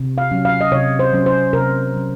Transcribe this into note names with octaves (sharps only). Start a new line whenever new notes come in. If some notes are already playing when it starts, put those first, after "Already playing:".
Already playing: C3
F5
F#3 C#4
F5
D#5
C3 C#5
C5
F#3 C#4
C5
C3 A#4
F#3 C#4